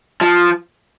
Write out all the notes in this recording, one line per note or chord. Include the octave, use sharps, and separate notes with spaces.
F3